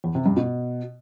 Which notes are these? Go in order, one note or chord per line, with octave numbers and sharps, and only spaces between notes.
E2
C3
G2
B2